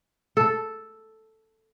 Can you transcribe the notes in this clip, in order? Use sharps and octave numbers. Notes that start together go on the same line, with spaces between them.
A4